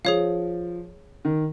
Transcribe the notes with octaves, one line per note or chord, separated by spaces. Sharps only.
F3 G#4 C#5 F5
D#3